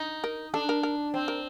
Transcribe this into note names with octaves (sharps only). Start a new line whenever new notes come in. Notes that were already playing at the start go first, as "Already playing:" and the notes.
Already playing: D#4
A#4
D4 A4
A#4
A#4
C4
A#4